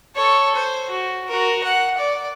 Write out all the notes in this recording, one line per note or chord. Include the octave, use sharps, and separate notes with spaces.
A4 C#5
C5
F#4
F#4 A#4
F#5
D5